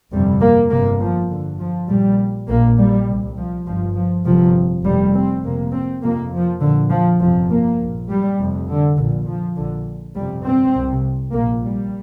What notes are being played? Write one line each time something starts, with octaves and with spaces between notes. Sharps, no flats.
G1 F2 C3 G3
A#3
G1 F2 C3 A#3
F3
G1 G2 D3
F3
A#1 A#2 G3
A#1 A#2 A#3
G3
C2 C3
F3
G1 G2 F3
F3
G1 F2 C3 F3
F1 F2 C3 G3
C4
F1 F2 C3 A#3
C4
F1 F2 C3 A#3
F3
A#1 A#2 D3
F3
G1 F2 C3 F3
A#3
A#1 A#2
G3
F1 F2 C3
D3
A#1 A#2 D3
F3
A#1 A#2 D3
G1 F2 C3 G3
C4
C2 C3
A#1 A#2 A#3
G3